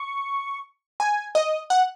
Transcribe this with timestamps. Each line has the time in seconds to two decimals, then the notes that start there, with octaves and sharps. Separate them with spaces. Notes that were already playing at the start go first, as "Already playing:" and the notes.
Already playing: C#6
1.00 G#5
1.35 D#5
1.70 F#5